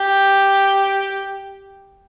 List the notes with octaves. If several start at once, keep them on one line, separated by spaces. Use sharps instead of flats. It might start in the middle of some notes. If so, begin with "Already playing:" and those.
Already playing: G4